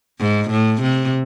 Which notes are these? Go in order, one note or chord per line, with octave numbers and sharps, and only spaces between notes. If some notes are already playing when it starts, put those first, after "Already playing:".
G#2
A2
C3